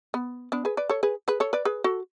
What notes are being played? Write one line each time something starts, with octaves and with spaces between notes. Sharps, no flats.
B3
B3 D4
G#4 B4
B4 D5
A4 C#5
G#4 B4
G#4 B4
A4 C#5
B4 D5
G#4 B4
F#4 A4